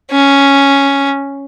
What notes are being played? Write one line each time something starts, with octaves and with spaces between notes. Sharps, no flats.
C#4